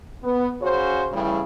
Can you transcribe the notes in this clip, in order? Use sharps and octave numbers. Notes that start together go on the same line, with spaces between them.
B3
C#3 C#4 F#4 C5
A2 C#3 E3 G3